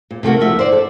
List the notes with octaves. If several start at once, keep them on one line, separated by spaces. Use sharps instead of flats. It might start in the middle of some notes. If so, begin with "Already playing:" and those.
A#2
C3 A3 A#3 F#4
D2 F3 E5
C5 D5
A4